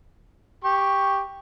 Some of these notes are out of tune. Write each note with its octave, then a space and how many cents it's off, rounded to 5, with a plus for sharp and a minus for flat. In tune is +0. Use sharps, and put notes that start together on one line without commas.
G4 +5 C#6 +0